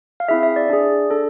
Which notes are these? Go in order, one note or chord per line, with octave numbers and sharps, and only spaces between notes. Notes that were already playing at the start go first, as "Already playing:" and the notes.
F5
C4 E4 G#4 E5
E5
D5
D4 G#4 D5
D4 A4